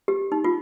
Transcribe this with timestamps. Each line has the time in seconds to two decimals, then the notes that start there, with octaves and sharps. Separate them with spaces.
0.08 G4
0.32 D#4
0.44 F4